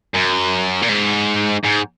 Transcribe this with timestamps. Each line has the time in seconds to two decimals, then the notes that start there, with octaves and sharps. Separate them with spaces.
0.15 F#2
0.82 A#2
0.89 G#2
1.64 G#2